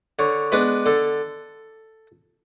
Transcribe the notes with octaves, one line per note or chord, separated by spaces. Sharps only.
D3 C#5
G#3 B3 D4 B4
D3 A4